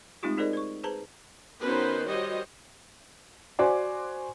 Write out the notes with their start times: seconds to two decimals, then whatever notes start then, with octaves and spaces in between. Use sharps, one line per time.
0.23 G#3 A3 C4 D#4 F4 G4
0.37 D#4 G#4 A#4 C5 D5 D#5
0.53 C5 C#6
0.84 G#4 B4 C5 A5 A#5
1.61 D#3 B3 C#4 F#4 B4 C5
2.05 G3 F#4 C5 C#5 D#5
3.59 F#4 C5 D5 G#5 C6 D6